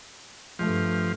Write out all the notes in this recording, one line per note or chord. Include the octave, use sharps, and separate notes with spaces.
G2 F3 A3